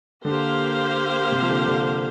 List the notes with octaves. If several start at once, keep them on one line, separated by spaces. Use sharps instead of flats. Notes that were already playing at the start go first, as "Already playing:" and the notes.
D3 A#3 G4 C5 F5
C3
F3
D3
D3